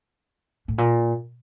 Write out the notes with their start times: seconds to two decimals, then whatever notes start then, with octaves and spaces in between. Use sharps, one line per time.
0.68 A2
0.78 A#2